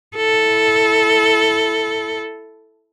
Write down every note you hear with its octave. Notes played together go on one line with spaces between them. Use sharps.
E4 A4